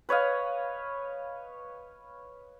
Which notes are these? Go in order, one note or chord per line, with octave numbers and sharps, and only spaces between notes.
B4 C#5 D#5 F5